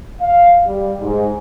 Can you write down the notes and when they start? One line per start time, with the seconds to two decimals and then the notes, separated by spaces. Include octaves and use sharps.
0.21 F5
0.66 G3
1.00 G#2